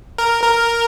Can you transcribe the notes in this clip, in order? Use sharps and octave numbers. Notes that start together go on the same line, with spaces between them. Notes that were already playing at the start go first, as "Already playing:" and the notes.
A#4
A#4